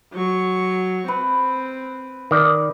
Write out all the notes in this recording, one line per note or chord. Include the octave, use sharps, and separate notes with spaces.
F#3 C#6
C4 B4
D#3 D5